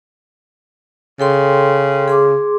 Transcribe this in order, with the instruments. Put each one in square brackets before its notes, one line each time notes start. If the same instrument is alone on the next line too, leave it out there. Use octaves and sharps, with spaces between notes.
[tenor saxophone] C#3 [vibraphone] A4 G5 C6
[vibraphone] G#4 C6 D6